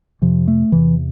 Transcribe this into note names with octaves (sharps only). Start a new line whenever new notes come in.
F2 C3 F3
A3
E2 C3 E3